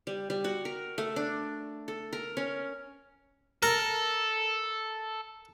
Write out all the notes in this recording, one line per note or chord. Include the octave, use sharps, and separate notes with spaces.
G3
G3
F#4
A#4
A3
D4
A4
A#4
C#4
A4 A#4